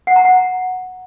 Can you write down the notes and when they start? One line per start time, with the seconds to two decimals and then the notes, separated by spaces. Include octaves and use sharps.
0.07 F#5
0.16 A#5
0.25 F#5